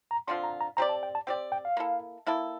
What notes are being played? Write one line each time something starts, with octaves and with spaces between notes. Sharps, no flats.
A#5
D3 F3 C4 F4 C6
A#5
A#5
C4 G4 D5 A#5
A5
G5
A5
C4 G4 D5 G5
G5
F5
A#3 E4 A4
A#3 E4 A4